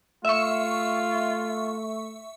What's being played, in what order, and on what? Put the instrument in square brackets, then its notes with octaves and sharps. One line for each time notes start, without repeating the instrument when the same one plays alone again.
[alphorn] A3 [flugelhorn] F4 [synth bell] E5 C#6